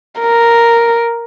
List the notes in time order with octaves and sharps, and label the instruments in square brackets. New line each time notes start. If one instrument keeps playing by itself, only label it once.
[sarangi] A#4